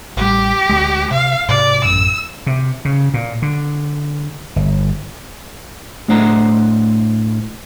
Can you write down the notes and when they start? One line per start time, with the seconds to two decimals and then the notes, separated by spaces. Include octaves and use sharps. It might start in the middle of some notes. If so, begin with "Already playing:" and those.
0.17 A1 G3 G4
0.69 D2 G#3
1.11 C3 F5
1.49 G#2 C3 D5
1.85 A1 F#2 E6
2.47 C3
2.85 C#3
3.14 A#2
3.42 D3
4.56 G1
6.08 A2 A3 D4 C5 F#5 A#5